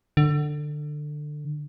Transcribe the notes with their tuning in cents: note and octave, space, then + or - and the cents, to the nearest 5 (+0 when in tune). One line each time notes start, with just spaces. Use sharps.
D3 +20